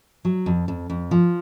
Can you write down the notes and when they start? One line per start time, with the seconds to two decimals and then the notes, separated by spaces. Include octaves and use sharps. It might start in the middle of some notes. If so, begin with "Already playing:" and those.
0.25 F#3
0.46 F2
0.68 F2
0.90 F2
1.11 F3